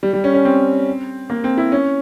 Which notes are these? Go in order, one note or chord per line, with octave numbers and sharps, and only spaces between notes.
G3
G3
C#4
C#4
C4
A#3
C4
E4
C#4